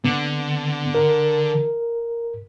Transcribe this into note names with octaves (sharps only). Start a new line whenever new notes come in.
D3 B3
A#4